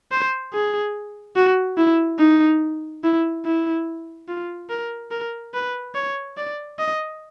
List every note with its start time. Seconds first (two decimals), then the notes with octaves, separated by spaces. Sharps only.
0.12 C5
0.53 G#4
1.36 F#4
1.78 E4
2.19 D#4
3.04 E4
3.45 E4
4.28 F4
4.70 A#4
5.11 A#4
5.54 B4
5.95 C#5
6.37 D5
6.79 D#5